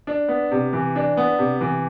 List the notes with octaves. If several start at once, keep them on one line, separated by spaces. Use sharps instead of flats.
D4
B3
C3
E3
D4
B3
C3
E3